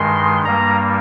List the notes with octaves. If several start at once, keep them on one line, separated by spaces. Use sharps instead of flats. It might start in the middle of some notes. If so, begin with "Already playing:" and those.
Already playing: G2 D#3 G#3 C6
G2 G3 A#3 A#5